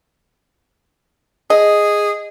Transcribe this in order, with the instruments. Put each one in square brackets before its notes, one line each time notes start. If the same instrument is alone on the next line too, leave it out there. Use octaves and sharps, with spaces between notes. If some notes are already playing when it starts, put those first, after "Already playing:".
[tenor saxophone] G#4 [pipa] D#5